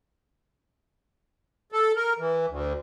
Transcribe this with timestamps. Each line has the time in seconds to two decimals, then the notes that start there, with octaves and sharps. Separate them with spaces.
1.72 A4
1.96 A#4
2.19 E3
2.49 D2